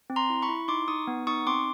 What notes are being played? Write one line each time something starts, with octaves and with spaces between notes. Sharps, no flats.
C4
A#5 C6
E4
B5 C#6
E4
D#4 C6 D6
D#4 C#6 D#6
B3
D#4 C#6 D#6
C4 C6 D6